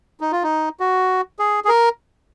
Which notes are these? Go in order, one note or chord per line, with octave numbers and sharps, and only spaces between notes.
D#4
F4
D#4
F#4
G#4
G#4
A#4